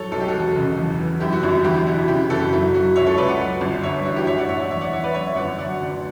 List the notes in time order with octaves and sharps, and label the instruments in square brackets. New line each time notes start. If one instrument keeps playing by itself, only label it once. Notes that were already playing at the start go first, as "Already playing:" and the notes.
Already playing: [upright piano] A2 F#3 A4 C#5
B1 A4
G4
F#4 A4
E1
C#3
E2
E3
F#2 E4 G4
F#4
G1 E4
E2 E4 G4
B2 F#4
C#3 E4 G4
F#1 F#4 A4
F#3 E4
F#3 F#4
C#2 C#5 E5
A4 C#5
C#2 B4 D5
D5 F#5
F#3
G1
G2 C#5 E5
E3 F#4
E4 G4
A1 C#5 E5
D5 F#5
A2 C#5 E5
E2 C#5 E5
D5 F#5
E2 C#5 E5
B4 D5
F#2 C#5 E5
E5
G1 D5 F#5
F#3 D5 F#5
D2